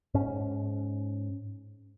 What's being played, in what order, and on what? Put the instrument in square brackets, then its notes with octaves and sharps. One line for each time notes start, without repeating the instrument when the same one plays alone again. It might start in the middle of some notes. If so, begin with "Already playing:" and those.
[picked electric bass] G#2 C#4